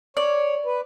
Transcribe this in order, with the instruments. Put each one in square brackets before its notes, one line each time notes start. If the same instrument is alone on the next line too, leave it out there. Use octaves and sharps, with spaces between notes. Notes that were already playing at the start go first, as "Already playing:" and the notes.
[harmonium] C#5 [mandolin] D5
[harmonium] B4